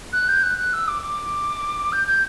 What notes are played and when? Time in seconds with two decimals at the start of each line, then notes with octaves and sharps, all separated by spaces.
0.13 F#6
0.29 G6
0.43 F#6
0.58 F#6
0.73 E6
0.88 D6
1.02 D6
1.93 G6
2.08 G6